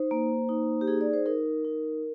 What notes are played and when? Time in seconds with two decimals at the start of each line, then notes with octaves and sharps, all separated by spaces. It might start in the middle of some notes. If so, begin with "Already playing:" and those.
Already playing: D#4 C5
0.11 A#3
0.49 D#4
0.81 G4
0.88 D#4 G#4
1.01 D5
1.13 C5
1.26 D#4 A#4
1.65 D#4